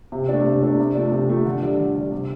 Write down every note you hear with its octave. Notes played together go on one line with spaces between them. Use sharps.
C3
A3 D4
C3
A3 D4
C3
F3 A3 D4
C3
F3 A3 D4
D3
G3 D4
D3
G3 D4
C3